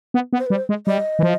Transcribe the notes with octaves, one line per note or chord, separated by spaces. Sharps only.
B3
B3
C5
B4
G3
C5
G#3
G3 D#5
E3
F3